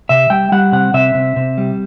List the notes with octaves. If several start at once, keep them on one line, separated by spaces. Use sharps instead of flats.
C3 E5
G3 G5
G3 F#5
C3 F#5
C3 E5
C3
C3
G3